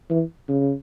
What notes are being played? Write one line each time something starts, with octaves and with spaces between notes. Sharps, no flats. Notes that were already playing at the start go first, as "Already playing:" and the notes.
E3
C#3